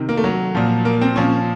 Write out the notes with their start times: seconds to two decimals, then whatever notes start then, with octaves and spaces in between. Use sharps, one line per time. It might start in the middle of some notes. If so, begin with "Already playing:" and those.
Already playing: C3 D#3
0.09 A#3
0.17 A3
0.24 F#3
0.55 A#2 F3
0.85 A#3
1.01 C4
1.16 A#2 F3 C#4